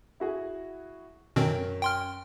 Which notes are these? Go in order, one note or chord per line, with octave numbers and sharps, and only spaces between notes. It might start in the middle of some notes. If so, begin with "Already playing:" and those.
E4 F#4 G#4
F#2 B2 D#3 C4 A#4
G5 C6 F6